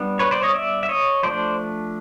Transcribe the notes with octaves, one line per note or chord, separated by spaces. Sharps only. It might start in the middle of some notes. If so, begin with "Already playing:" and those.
Already playing: G3 B3 D4
B4 C#5
C5 D5
C#5 D#5
D5 E5
E5
C#5 D#5
F3 A3 D4 C5 D5